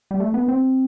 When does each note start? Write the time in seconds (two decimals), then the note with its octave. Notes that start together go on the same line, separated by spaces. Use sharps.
0.11 G3
0.20 A3
0.34 B3
0.48 C4